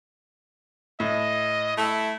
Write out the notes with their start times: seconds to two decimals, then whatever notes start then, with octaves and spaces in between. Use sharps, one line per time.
1.00 A2 D#5
1.77 A3 E4